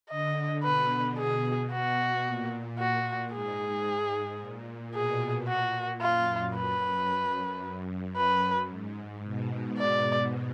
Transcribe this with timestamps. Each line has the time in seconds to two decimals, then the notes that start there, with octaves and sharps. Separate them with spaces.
0.10 D3 D#5
0.64 B2 B4
1.18 G#4
1.72 B2 F#4
2.25 A#2
2.79 F#4
3.33 G#2 G#4
3.87 G#2
4.41 A#2
4.94 B2 G#4
5.48 A#2 F#4
6.01 F#2 F4
6.56 B4
7.09 F#2
7.63 F#2
8.16 B4
8.70 G#2
9.24 B2
9.78 D5